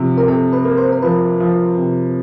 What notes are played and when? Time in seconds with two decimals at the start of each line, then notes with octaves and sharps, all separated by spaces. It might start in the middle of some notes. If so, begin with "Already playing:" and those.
Already playing: C3 F3
0.18 A#4
0.28 C3 A4
0.53 B4
0.65 A#3
0.77 C5
0.92 A#4
1.02 F3 B4
1.40 F3
1.78 C3